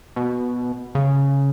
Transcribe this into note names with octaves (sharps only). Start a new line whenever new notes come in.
B2
C#3